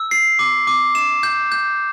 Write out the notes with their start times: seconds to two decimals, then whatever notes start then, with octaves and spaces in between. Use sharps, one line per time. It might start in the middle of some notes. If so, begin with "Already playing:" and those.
Already playing: E6
0.11 C7
0.39 D6
0.67 D6
0.95 E7
1.23 G6
1.52 G6